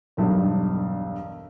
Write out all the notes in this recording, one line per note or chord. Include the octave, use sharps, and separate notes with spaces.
E1 B1 G2